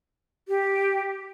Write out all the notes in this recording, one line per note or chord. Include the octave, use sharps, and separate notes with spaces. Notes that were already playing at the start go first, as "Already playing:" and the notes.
G4